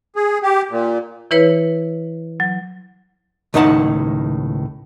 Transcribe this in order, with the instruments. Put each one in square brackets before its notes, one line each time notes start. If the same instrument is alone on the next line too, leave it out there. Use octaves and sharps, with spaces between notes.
[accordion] G#4
G4
A#2
[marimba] E3 E4 B4 C#5
F#3
[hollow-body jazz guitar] C#2 A2 D#3 D#4 F#5 A5